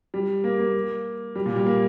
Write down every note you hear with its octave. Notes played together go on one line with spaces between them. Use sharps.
G3
A#3
A#3
G3
A#2
G3
A#3